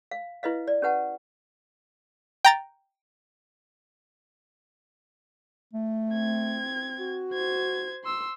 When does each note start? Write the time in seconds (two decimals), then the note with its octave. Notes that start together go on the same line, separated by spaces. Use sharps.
0.11 F5
0.43 E4 B4 D#5 F5
0.68 D5
0.82 C#4 G4 B4 F#5 A5
2.45 G5 A#5 A6
5.73 A3
6.13 C4 G#6
6.99 F#4
7.33 C5 G#6
8.04 C6 E6